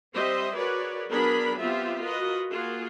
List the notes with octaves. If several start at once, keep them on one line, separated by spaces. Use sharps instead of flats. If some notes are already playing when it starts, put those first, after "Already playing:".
G3 C4 C5 D#5 E5
F#4 G#4 A#4 B4 C#5 D5
F#3 B3 D4 G#4 A#4 B5
B3 C4 F4 G4 E5
F4 F#4 A#4 B4 D#5
A#3 F4 F#4 G#4